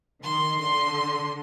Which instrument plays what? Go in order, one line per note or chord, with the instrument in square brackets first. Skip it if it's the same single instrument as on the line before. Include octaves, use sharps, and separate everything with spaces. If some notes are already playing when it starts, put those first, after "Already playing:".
[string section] D#3 [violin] C6
[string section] D3 [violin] C6